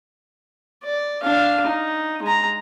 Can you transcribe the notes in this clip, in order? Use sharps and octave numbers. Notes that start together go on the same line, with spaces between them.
D5
D4 F5
D#4
G#3 A#5